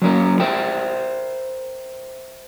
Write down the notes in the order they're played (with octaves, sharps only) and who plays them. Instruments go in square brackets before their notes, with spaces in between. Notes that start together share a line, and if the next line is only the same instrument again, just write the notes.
[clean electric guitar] F#3 A#3 C#4 A#4
A#4 C5 E5 G5